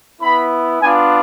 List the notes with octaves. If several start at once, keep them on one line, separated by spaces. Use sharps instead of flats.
B3 E4 B5
B3 D4 F4 G#5